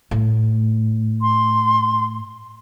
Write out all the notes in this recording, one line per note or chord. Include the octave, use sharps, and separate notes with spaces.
A2
C6